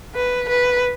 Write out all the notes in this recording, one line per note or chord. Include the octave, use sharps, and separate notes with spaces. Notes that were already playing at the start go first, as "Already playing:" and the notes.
B4
B4